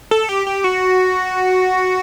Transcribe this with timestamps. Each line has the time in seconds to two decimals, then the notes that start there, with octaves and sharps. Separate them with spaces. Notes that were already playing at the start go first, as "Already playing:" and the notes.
0.11 A4
0.29 G4
0.47 G4
0.64 F#4